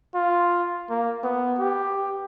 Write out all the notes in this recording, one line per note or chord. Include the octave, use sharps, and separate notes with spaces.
F4
A#3
B3
G4